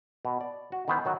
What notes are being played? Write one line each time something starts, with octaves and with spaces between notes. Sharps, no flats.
B2
D5
F#4
D#3 E3 B3 B4 C5
D#3 F#3 F#4